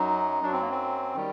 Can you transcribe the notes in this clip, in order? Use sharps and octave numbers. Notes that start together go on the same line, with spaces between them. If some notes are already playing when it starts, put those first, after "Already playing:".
Already playing: F#2 F#3 D#4
F#2 F#3 D4
C4
A#3
C4
D#3 G3